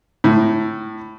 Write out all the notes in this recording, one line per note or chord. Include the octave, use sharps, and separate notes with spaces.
A2